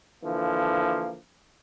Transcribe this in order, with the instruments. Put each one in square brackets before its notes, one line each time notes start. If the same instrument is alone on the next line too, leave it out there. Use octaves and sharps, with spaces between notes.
[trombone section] D3 E3 F3 A#3